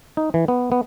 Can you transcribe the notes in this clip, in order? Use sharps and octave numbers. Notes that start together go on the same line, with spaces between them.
D#4
E3
B3
B3